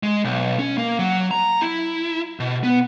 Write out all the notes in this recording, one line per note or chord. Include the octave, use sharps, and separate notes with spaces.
G#3
B1
C#4
A#3
F#3
A#5
E4
B2
B3